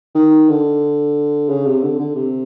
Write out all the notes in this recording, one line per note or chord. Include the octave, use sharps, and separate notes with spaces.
D#3
D3
C#3
C3
D3
D3
C3